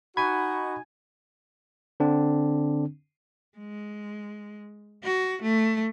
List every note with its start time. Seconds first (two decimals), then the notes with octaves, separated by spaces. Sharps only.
0.17 D#4 F#4 G#5 B5 G#6
2.00 D3 C4 D4
3.58 G#3
5.04 F#4
5.42 A3